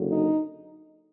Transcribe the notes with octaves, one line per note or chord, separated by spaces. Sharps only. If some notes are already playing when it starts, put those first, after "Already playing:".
Already playing: F#1 F#2 D3
D#4